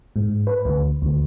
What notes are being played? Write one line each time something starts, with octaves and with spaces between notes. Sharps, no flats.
G#2
B4
D2
D2